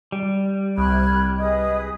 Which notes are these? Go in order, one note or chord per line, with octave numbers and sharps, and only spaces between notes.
G3
C2 B5 F6 F#6 G#6
G#4 B4 D#5 D#6